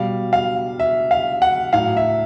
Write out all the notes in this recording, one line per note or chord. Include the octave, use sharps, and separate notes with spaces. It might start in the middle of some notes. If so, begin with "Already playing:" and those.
Already playing: B2 G3 F5
F5
E5
F5
F#5
A2 F#3 F5
E5